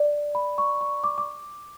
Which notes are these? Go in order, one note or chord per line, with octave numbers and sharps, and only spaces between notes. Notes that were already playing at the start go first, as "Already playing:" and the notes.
Already playing: D5
B5
C#6
C#6
D6
D6